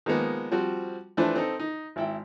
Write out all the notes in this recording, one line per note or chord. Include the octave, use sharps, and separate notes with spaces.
D#3 F3 G#3 A#3 B3
F3 G3 C4 F#4
E3 F3 A3 D4 B4 C5
C4 D#4 A4
D#4
G#1 E4 G5